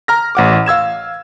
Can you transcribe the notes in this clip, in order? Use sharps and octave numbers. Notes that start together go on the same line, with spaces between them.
A#5 F6 A#6
A1 F#5 D6
F5 E6 G#6 E7